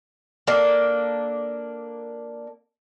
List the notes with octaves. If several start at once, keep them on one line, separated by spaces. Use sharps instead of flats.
A#3 D4 A4